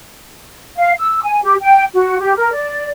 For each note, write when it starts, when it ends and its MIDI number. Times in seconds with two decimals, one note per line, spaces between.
0.77 0.91 77
0.99 1.22 88
1.23 1.38 80
1.42 1.55 67
1.61 1.84 79
1.94 2.16 66
2.20 2.33 67
2.36 2.51 70
2.52 2.88 74